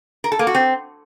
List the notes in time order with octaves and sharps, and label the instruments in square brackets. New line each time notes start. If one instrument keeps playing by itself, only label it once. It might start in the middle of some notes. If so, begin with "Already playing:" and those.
[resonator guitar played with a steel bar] A#4
A4
A#3
F#4
C4